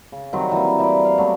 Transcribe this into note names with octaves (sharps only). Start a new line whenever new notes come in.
C#3
D#3 F#3 G3 C4
E3 A#3
E3 D5
F5
F#3 A3 B3